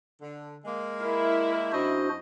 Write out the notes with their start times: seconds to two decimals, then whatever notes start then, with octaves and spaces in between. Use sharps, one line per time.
0.22 D3
0.65 G#3 A#3
1.02 E4 A#4
1.72 F#2 C4 D4 F#4 C5 D#5